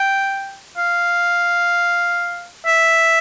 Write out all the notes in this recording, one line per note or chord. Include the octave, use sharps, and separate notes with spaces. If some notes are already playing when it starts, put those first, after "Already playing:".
Already playing: G5
F5
E5